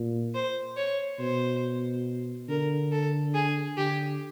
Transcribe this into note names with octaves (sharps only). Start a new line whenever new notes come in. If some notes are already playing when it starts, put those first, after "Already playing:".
Already playing: A#2
C5
C#5
B2 C5
D3 A#4
A4
G#4
D3 G4